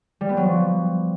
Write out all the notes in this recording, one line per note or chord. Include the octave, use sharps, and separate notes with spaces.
G3
B3
F#3
F3